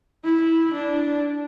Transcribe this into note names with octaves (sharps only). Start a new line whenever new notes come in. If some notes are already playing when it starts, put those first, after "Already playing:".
E4
D4